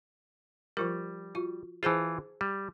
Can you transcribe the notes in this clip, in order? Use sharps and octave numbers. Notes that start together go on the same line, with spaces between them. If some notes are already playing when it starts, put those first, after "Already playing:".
F3 G3 F4 A#4
F4 F#4
E3 F4 G#4 C5 A5
G3